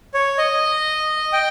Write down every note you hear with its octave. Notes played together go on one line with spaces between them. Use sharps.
C#5
D#5
G5